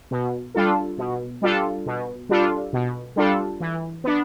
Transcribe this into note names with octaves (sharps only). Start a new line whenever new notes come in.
B2
G3 D4 F4 A4
B2
G3 D4 F4 A4
B2
G3 D4 F4 A4
B2
G3 D4 F4 A4
E3
B3 D4